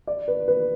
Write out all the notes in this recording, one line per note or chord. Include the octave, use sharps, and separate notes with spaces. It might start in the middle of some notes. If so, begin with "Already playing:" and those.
D5
B4
B4